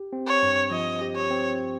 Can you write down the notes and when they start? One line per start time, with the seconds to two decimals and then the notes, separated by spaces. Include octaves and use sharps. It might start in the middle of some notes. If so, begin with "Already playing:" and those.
Already playing: G4
0.13 C4
0.27 C#5
0.43 G2
0.71 F3 D#5
1.01 G4
1.16 C#5
1.30 C4